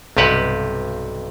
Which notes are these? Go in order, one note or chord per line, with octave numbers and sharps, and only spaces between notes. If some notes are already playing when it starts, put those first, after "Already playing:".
B1 G2 C3 G4 B4 F#5